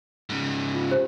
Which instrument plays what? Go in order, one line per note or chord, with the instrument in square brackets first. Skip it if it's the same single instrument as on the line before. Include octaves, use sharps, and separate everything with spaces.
[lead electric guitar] G#2 C#3
[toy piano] F4
G4 C5